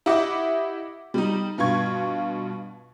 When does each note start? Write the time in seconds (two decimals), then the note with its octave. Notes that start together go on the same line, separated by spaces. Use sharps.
0.06 E4 G4 D#5 F#5 D6
1.14 G3 D#4
1.58 G2 B2 F4 C#6 G#6